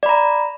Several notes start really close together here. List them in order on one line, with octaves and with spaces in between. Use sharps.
D5 B5 A#5